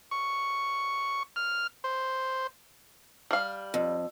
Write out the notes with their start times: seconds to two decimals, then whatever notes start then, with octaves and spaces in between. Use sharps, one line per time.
0.11 C#6
1.36 F6
1.84 C5
3.31 G3 F5
3.74 F2